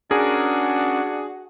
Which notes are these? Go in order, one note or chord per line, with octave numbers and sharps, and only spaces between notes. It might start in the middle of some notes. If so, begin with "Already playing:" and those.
C#4 D4 F#4 G#4 A#4